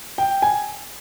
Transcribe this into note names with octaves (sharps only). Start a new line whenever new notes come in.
G5
G#5